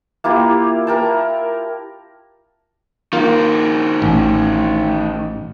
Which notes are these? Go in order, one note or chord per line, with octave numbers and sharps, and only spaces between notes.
A#3 E4 F4 G4
A#4 G5 A5
D#3 A#3 F4 F#4
A1